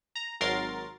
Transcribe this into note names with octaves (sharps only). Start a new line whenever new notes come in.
A#5
G#1 F#3 A#4 C6 A6 C7